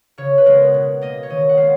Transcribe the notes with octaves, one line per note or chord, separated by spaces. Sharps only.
C#3 C#5
B4
G#3 B3 A#4
B2
A#3 D#5
C#5
D#3 D#5
F#5
G#3 B3 F5